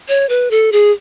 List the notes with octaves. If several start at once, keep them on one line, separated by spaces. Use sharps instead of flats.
C#5
B4
A4
G#4